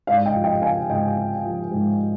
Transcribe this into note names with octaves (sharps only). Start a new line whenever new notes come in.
G#2 D5 F5
D#5 G5
F3
D#5 G5
C4 F5 G#5
G#2 D#5 G5
C4
F3
G#2